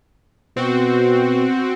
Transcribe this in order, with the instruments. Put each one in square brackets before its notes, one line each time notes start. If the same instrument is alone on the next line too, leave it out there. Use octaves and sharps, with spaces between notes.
[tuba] B2 [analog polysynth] C4 F#4